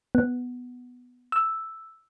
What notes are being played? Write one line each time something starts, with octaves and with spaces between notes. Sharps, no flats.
B3
E6